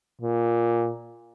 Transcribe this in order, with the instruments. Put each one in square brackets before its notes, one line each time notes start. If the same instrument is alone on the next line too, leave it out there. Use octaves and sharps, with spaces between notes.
[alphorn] A#2